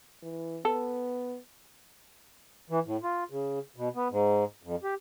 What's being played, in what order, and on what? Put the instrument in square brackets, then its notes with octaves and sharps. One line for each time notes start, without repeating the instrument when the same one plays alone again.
[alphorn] E3
[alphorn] B3 [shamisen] A4
[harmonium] E3
A2
F4
C#3
B2
B3
G#2
F2
G4